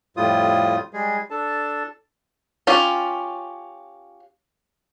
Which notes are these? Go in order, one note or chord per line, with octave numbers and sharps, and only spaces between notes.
F2 A2 G3 F4 D#6
G3 G#3 G#4
D4 A4 A5
C#4 F4 G4